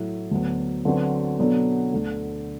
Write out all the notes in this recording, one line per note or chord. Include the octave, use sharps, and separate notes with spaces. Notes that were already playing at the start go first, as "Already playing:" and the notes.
Already playing: A2 F#3 A3 E4
D2 D3 F#3 B3
D3 F#3 C4 F#4 B4
B2 F#3 B3 D4 A4
D2 D3 A3